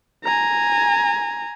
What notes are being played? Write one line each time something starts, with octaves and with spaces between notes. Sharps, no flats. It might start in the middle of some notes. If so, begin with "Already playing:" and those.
G#5 A#5